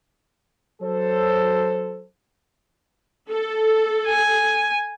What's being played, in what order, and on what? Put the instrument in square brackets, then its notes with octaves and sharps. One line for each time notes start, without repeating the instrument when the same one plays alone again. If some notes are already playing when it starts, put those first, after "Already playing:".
[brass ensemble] F#3 A4 C5
[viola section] A4
[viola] G#5